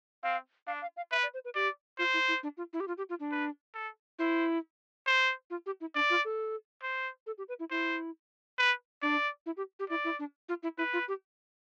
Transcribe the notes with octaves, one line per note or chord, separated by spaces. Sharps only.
C4 F5
D4 F5
F5
F5
B4 E5
D5
C5
B4
G4 D5
F4 C5
E4
E4
D4
F4
E4
G4
F4
G4
F4
D4
B4
A4
E4 C5
C5
F4
G4
E4
D4 D5
F4
A4
C5
A4
G4
B4
E4
E4 C5
B4
D4 D5
E4
G4
G4
E4 D5
E4
D4
F4
E4
E4 B4
F4
G4